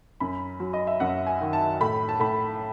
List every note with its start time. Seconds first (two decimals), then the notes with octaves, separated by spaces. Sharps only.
0.20 F#2 B5
0.60 F#3
0.73 D#5
0.87 E5
1.00 F#2 F#5
1.27 G#5
1.41 D#3
1.53 A5
1.81 A2 B5
2.09 A5
2.20 A2 B5